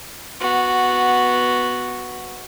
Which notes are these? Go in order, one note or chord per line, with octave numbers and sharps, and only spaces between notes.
B3 F#4